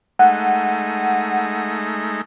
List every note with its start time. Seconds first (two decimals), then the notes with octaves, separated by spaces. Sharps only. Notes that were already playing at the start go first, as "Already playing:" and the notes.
0.19 G#3 A3 D#4 F#5